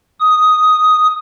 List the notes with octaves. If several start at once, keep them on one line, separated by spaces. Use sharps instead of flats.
D#6